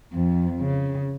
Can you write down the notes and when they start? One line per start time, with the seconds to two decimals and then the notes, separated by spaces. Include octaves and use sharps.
0.11 F2
0.60 C#3